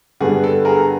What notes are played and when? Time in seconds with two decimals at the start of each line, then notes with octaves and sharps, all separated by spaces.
0.20 G2 D3 G3 B3 G#4
0.43 A4
0.65 G#4 A#4